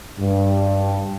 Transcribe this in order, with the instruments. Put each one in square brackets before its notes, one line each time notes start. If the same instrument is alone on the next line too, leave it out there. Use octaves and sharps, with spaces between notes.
[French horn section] G2